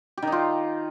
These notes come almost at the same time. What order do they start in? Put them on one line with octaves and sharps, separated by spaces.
G4 D#3 D#4 F4